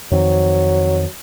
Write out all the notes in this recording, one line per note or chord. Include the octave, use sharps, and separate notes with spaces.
F2 D#3 F#3 C4